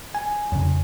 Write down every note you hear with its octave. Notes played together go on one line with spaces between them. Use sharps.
G#5
F2 C#3